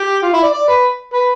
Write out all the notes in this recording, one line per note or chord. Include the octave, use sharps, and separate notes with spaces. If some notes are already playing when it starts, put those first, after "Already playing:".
Already playing: G4
F4
E4
D5
D5
B4
B4